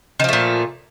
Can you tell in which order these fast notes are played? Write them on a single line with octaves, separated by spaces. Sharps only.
D#3 F3 A3 A#2